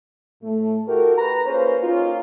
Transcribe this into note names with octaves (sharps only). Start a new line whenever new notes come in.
A2 A3
E4 F#4 G4 A4 A#4
B4 A#5
A#3 C#4 F4 G#4 B4 C5
A#3 C#4 D#4 F4